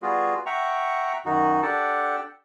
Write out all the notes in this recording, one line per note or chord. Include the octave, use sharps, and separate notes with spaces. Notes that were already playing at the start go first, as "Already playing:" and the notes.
G3 B3 F4 F#4 G#4
E5 F#5 G5 A#5 C#6
F#2 D#3 D#4 F#4
D4 G4 A4 F#5 G5 A5